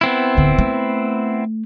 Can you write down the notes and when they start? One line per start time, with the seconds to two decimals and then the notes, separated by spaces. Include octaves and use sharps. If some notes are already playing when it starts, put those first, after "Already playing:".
0.01 B3 C4 E4
0.37 D1 D3
0.59 A3